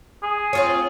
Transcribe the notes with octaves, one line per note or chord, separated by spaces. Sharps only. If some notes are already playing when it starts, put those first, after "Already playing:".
G#4
C4 F4 C#5